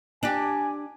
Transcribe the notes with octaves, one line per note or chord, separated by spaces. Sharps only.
D4 G4 G#5